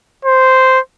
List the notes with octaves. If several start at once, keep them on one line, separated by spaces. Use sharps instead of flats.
C5